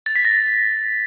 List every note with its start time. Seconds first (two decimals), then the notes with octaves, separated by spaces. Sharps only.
0.06 A6
0.16 B6
0.25 A#6